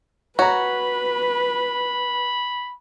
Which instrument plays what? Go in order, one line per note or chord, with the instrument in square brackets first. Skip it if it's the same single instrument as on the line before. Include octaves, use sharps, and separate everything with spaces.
[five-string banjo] F#4 [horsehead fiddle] B4 [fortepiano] C#5 A#5 [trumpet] B5